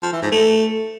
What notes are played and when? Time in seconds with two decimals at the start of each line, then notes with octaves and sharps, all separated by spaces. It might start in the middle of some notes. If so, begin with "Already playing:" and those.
0.03 F3
0.13 E3
0.22 G#2
0.32 A3